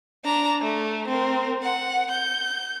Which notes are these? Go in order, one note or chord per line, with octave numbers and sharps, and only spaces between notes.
D4 A#5
A3
C4 A#4
F#5
G6